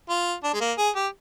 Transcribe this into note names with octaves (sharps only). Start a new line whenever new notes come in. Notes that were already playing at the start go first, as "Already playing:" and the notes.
F4
D4
G#3
A#3
G#4
G4